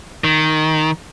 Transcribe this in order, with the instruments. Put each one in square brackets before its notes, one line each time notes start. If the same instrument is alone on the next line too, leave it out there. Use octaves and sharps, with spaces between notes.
[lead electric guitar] D#3